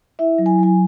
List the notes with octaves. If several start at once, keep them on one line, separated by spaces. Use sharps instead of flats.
E4 E5
F#3
G#5
F#3 G#5